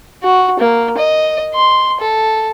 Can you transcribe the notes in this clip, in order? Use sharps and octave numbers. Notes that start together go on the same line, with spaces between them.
F#4
A#3
D#5
C6
A4